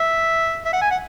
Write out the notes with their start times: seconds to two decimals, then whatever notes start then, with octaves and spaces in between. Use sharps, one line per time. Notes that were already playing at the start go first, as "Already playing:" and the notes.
Already playing: E5
0.65 E5
0.73 F#5
0.82 G#5
0.91 F#5